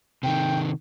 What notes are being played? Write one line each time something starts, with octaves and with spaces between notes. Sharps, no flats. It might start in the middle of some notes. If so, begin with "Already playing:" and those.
C3 D#3 G5